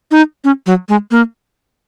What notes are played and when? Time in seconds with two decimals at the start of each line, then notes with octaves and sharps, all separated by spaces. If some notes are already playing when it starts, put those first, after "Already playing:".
0.11 D#4
0.44 C#4
0.66 F#3
0.89 G#3
1.11 A#3